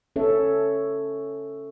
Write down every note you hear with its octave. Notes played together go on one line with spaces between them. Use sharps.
C#4 A4 C#5 E5